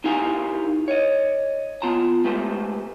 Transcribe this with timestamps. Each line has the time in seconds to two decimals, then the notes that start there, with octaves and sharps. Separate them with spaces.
0.04 D#4 E4 G4 A#4 F5 G#5
0.88 C#5 D#5
1.82 B3 F4 A5 A#5
2.24 G#3 A3 G4 B4 C5